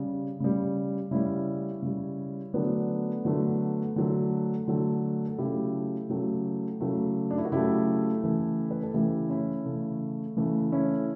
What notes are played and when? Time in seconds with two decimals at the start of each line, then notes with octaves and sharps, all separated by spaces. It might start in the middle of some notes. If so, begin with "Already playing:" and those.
Already playing: C#3 G3
0.40 C#3 G3
1.11 C#3 G3 C#4 E4
1.82 C#3 G3
2.54 D3 F#3 A3 B3 D4
3.25 D3 F#3 A3
3.96 D3 F#3 A3
4.68 D3 F#3 A3
5.27 A4
5.38 C#3 F#3 A3 E4 G4
6.09 C#3 F#3 A3
6.81 C#3 F#3 A3
7.31 D4
7.38 E4
7.45 F#4
7.52 C#3 F#3 A3 E4 G4
8.23 C#3 E3 A3
8.71 B4
8.83 A4
8.94 C#3 E3 A3 E4 G4
9.30 C#4 E4
9.65 C#3 E3 A3
10.37 C#3 E3 A3
10.72 C#4 E4